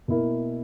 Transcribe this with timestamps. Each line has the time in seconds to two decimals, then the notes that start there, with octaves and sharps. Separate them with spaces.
0.08 B2 A#3 E4 A#4